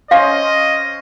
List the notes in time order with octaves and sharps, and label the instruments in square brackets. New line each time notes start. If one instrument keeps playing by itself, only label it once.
[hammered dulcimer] C#4 C5 [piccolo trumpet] D#5 [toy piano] F5